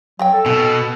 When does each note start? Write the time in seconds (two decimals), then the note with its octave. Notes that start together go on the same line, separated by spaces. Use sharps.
0.19 F#3 G4 D#5 G5
0.33 A4
0.46 B2 D#4